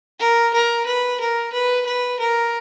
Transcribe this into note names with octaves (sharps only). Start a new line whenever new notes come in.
A#4
A#4
B4
A#4
B4
B4
A#4